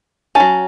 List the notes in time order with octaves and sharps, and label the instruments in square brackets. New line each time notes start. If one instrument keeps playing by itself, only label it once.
[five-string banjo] F#3 C#4 A5